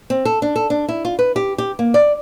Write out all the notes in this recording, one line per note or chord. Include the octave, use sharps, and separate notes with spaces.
C4
A4
D4
A4
D4
E4
F4
B4
G4
G4
A#3
D5